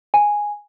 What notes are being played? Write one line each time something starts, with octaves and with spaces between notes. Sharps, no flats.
G#5